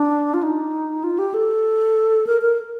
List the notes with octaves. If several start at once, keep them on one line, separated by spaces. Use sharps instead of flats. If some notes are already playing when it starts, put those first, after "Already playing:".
Already playing: D4
F4
D#4
F4
G4
A4
A#4
A#4